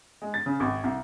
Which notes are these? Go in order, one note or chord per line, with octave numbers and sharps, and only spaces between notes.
G#3
A6
C#3
G#1
C2